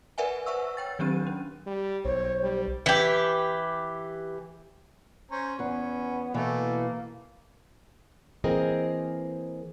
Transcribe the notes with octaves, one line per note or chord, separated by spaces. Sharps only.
A#4 B4 D5 E5 F#5 G#5
B4 C5 E5 F#5 C#6 E6
C#5 G5 A6
D#3 F#3 C4 D4 G4 D#7
C#4
G3
B1 C5 C#5
G3
E3 G4
C#4 C5 A#5
E2 B3 C#4 B4
B2 E3 A3 A#3
E3 A#3 C4 G#4 A#4 D#5